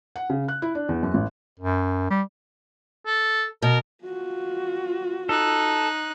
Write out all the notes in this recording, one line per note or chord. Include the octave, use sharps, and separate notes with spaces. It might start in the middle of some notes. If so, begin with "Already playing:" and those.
F#5
C#3
F#6
E4
D4
E2
F#2
A1
F#2
G3
A4
B2 A#4
F4 F#4
D#4 A4 F#6